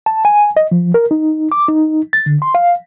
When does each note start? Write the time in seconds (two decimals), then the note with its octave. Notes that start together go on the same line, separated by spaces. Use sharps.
0.06 A5
0.25 G#5
0.57 D#5
0.72 F3
0.94 A#4
1.11 D#4
1.52 D6
1.68 D#4
2.13 A6
2.26 D3
2.42 C6
2.55 F5